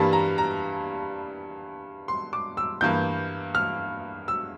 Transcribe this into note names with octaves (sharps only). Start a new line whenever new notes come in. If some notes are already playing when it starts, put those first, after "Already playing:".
Already playing: G2 E3 G3 A#3 A5
A#5
A#5
C6
D6
E6
G2 E3 A#3 G6
F6
E6